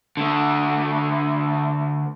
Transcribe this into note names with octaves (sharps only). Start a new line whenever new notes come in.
D3 A3